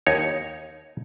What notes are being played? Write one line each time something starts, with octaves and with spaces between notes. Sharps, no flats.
D#2 D#4 C#5